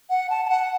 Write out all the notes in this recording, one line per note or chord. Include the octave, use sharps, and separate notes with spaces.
F#5
A5
A5
F#5